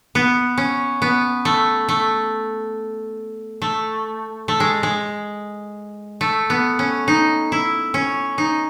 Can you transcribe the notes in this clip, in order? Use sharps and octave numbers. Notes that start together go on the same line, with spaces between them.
B3
C#4
B3
A3
A3
A3
A3
G#3
G#3
A3
B3
C#4
D#4
E4
C#4
D#4